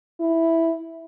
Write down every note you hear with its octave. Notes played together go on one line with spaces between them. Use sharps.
E4